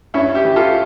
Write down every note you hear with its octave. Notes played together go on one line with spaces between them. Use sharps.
G2 C#4 E4
E4 G4
E3
F4 A4